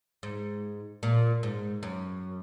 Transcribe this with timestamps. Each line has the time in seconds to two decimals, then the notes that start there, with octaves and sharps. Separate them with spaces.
0.23 G#2
1.03 A#2
1.43 G#2
1.83 F#2